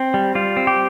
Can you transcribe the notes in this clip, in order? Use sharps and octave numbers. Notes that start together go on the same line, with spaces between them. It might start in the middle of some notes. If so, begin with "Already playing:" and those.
Already playing: C4
G3
G3 F4
C4
G4